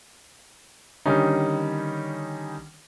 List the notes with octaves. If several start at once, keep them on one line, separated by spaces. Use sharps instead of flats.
D3 D#3 G3 C#4 D#4